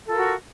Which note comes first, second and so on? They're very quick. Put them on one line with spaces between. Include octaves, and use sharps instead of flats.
A4 F4 A#4 F#4